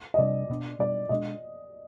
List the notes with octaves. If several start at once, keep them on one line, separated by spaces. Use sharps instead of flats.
D#5
C3 G3 D4 D5
B2 B3 D4
B2 G3 D4 D5
B2 G#3 D4 D#5